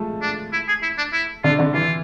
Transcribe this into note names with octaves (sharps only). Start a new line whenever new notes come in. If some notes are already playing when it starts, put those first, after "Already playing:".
Already playing: F3 G#3 A3 A4
D4
E4
G#4
E4
D4
E4
D3 D4 F4
D3 D4
E3 E4 F4